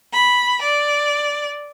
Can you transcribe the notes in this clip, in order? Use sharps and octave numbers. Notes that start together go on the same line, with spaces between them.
B5
D5